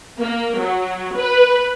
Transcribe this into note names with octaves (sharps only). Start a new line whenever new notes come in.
A#3
F#3
B4